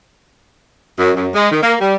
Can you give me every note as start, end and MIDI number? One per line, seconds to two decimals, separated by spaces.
0.99 1.12 42
1.16 1.29 42
1.35 1.51 56
1.52 1.60 51
1.63 1.75 58
1.81 1.96 55